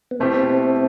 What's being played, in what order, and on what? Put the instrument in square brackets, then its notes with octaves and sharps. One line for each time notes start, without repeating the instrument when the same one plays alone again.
[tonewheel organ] B3
[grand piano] B2 A3 E4 G4 C5 [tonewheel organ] C4